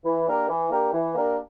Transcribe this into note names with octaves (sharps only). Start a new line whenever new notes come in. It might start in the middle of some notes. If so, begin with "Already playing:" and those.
E3
A#3 D4 G4 A#4
E3
A#3 D4 G4 A#4
E3
A#3 D4 G4 A#4